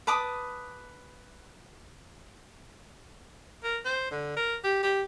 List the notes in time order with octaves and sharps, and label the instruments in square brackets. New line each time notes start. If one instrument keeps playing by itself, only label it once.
[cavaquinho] B4 A5 D6 D#6
[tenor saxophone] A#4
C5
D3
A#4
G4
G4